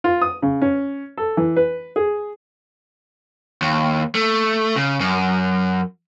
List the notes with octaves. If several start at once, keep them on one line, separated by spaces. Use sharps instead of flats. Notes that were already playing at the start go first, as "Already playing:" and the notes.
F4
D#6
C#3
C#4
A4
E3
B4
G#4
D#2
A3
C#3
F#2